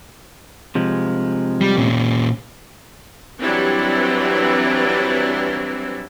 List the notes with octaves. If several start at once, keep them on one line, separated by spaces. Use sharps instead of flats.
C3 F3 G#3
G3
A#2 C#4
E3 F#3 G3 C4 D4 E4